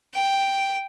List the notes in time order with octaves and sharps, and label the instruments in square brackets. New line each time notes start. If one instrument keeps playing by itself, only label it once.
[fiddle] G5